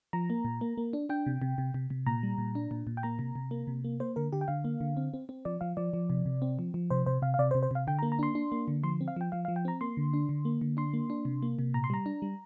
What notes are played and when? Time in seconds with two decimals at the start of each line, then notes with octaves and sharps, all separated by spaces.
0.13 F3 A#5
0.30 A#3
0.45 A#2
0.61 A#3
0.78 A#3
0.93 D4
1.09 D4 G5
1.26 C3
1.42 C3
1.58 C3
1.74 C3
1.90 C3
2.06 A#2 A#5
2.23 G3
2.38 A#2
2.55 D4
2.71 A#2
2.87 A#2
2.97 G5
3.03 A#3 A#5
3.19 C3
3.36 C3
3.51 A#3
3.67 C3
3.84 A#3
4.00 A#3 C5
4.16 D3 A#4
4.33 D3 G4
4.41 G5
4.48 D3 F5
4.65 A#3
4.81 D3
4.97 C4
5.14 C4
5.29 C4
5.45 F3 D5
5.61 F3 F5
5.77 F3 D5
5.93 F3
6.10 C3
6.26 C3
6.42 C4
6.59 F3
6.74 F3
6.90 C3 C5
7.06 C3 C5
7.22 C3 F5
7.34 F5
7.39 C3 D5
7.51 C5
7.55 C3
7.63 C5
7.71 C3 F5
7.87 D3 G5
7.99 A#5
8.03 A#3
8.12 A#5
8.19 D4 C6
8.35 D4
8.52 A#3
8.68 D3
8.83 F3 C6
9.01 C4
9.08 F5
9.16 F3 G5
9.32 F3 F5
9.45 F5
9.48 F3
9.56 G5
9.65 C4 A#5
9.81 A#3 C6
9.97 D3
10.13 D4
10.29 D3
10.45 A#3
10.61 D3
10.77 D4 C6
10.93 A#3
11.10 D4
11.25 C3
11.43 A#3
11.59 C3
11.74 A#2 A#5
11.84 C6
11.90 G3 A#5
12.06 D4
12.22 G3